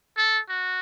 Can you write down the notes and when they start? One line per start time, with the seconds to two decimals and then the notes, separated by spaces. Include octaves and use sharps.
0.17 A4
0.49 F#4